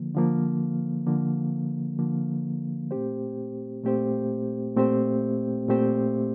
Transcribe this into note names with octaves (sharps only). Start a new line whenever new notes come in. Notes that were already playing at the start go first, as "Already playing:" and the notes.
Already playing: D3 F3 A#3
D3 F3 A#3
D3 F3 A#3
D3 F3 A#3
A#2 A3 C4 G4 C5
A#2 A3 C4 G4 C5
A#2 A3 C4 G4 C5
A#2 A3 C4 G4 C5